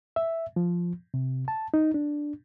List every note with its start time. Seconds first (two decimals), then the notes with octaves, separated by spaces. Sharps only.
0.16 E5
0.56 F3
1.14 C3
1.48 A5
1.74 D#4
1.94 D4